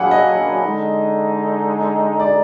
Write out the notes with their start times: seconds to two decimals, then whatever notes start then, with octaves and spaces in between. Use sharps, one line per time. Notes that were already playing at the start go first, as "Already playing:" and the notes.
Already playing: A#2 F#3 A#3 D4 G#4 F#5 B5
0.11 D#5
0.63 D3 G#3 D#4
2.20 D5